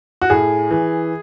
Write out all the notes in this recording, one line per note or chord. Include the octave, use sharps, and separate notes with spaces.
F#4
A2 G#4
E3